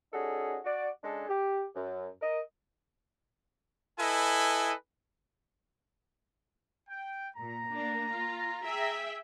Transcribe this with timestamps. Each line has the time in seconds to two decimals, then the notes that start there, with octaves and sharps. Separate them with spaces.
0.13 G3 C#4 D#4 F#4 G#4 A4
0.65 F#4 D5
1.03 C#3 G#3 D4 G#4 A4
1.29 G4
1.75 F#2
2.21 A#4 D#5
4.00 E4 A4 B4 D#5 G#5
6.89 G5
7.37 A#2 A#5
7.69 A#3 D4
8.11 F4
8.64 G#4 E5 G5